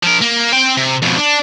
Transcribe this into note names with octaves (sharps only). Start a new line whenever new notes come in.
F3 A#4
A#3
C4 G5
C3
F2 B2
D4